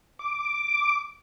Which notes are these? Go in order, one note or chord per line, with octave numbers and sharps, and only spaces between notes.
D6